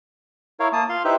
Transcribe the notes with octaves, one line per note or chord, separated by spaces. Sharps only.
E4 A#4 C#5 F5
A#3 A5 D#6
F4 F5 C6
D#4 E4 G4 B4 C5 E5